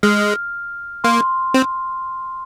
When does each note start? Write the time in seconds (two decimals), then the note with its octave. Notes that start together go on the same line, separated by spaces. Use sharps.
0.03 G#3 F6
1.04 A#3 C6
1.54 C4